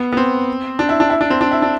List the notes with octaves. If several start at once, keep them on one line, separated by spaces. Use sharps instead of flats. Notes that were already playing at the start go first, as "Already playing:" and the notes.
Already playing: B3
B3
C4
D4
E4
D4
E4
D4
C4
D4
E4
D4